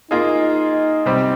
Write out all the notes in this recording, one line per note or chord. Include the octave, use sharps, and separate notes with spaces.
A#3 D#4 F4 G#4 D#5
C3 G3 C4 G4